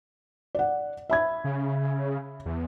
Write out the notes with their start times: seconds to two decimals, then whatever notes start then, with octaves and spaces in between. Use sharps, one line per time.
0.55 D5 F#5
1.09 E5 B5 G#6
1.44 C#3
2.46 E2